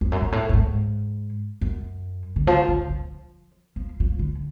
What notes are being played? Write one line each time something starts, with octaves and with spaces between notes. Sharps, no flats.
F2
F#2
G#2
A2
A2
G#2
F#2
D3
F3
D3
F3
F3
F3
D3